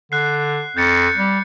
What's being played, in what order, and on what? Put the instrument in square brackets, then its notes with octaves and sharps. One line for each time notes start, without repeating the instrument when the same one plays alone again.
[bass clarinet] D3 [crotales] F#6 C7
[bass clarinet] F2 [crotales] G6 A6 C#7
[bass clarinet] G3